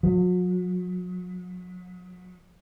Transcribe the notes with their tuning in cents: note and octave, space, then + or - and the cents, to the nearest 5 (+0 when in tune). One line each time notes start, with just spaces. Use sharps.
F#3 -40